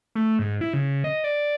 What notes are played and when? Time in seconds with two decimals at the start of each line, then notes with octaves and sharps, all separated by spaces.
0.15 A3
0.39 G#2
0.61 E4
0.74 C#3
1.04 D#5
1.24 D5